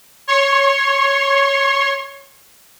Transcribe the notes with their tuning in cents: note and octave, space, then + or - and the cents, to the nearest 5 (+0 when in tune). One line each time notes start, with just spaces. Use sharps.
C#5 +0 C6 +45